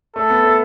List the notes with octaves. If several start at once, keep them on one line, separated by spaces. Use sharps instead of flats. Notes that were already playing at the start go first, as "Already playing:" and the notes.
A3 A4
B3
A3